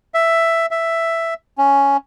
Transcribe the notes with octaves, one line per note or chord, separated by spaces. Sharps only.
E5
E5
C#4